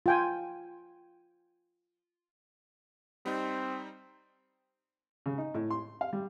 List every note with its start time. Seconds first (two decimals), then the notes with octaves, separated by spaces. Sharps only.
0.06 F4 G5 G#5
3.26 G3 C4 D#4
5.26 C#3
5.38 D#4
5.54 A2
5.70 C6
6.01 F5
6.13 G3